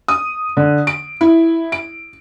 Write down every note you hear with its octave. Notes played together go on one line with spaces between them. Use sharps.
D#6
D3
D7
E4
D7